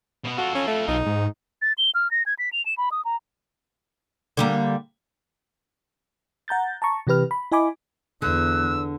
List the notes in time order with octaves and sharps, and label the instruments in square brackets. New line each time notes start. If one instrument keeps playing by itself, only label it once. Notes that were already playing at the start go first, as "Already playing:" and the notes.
[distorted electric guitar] B2 B3
[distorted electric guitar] F4 A4 [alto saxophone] F#4
[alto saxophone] C#4
A3
[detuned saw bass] B1 [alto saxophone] D#4
[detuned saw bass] G#2
[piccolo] A6
G7
F6
A#6
G#6
B6
F7
E7
B5
D#6
A#5
[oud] D3 G3 A#3
[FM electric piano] F#5 A#5 G6 A6
A5 A#5 C#6
C3 E3 G4 B4 F6
B5
E4 D#5 G#5 B5 D6
[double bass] E2 [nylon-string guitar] D3 [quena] E6 [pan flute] F#6